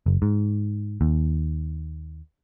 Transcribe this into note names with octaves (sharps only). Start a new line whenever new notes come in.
F#1
G#2
D#2